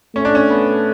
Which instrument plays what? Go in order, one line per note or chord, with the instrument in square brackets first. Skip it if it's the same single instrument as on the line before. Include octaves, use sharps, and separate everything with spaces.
[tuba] A3 [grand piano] C#4
[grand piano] D4
C#4
B3